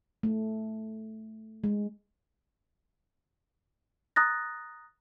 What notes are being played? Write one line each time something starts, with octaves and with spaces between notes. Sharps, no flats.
A3
G#3
A#5 D#6 F#6 A6 A#6